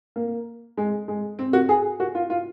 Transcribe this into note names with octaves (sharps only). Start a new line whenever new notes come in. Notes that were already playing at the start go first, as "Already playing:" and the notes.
A#3
G#3
G#3
C4
F#4
G#4
F#4
F4
F4